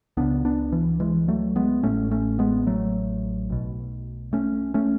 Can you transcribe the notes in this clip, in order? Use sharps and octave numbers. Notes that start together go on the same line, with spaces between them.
C#2 C#3 B3 D4
B3 D4
E3
E3 G#3
F#3 A3
G#3 B3
A1 A2 A3 C#4
A3 C#4
G#3 B3
F#3 A3
B1 B2
A3 C#4
A3 C#4